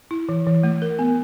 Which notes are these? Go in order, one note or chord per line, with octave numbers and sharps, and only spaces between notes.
E4
E3
E3
A3
A#4
B3